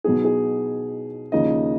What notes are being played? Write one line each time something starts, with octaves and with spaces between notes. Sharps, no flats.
B2 F#3 B3 D#4 G#4
G#4
D#2 C#3 F3 A#3 D#4 D#5